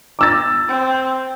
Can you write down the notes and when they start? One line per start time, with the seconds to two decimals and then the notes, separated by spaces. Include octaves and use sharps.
0.19 D6 E6 A6
0.68 C4